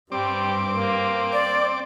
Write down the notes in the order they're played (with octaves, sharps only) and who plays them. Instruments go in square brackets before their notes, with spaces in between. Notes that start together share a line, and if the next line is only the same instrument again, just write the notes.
[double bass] G2 [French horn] G3 [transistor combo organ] C4 D6
[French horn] A#3
[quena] D5